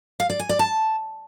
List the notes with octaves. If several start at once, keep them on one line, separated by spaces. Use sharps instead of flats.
F5
D5
G#5
D5
A5